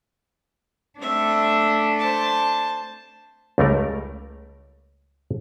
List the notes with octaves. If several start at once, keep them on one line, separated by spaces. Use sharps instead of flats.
A3 C4 D4 E5
C5 A5
C#2 G3 A3 A#4